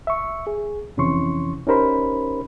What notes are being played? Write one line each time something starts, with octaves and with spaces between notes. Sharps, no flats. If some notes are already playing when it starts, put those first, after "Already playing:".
E5 C#6
G#4
F2 C3 E3 C#4 C6 C#6
C#4 D#4 G4 A#4 C5 B5